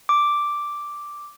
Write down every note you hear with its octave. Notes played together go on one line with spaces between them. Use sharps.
D6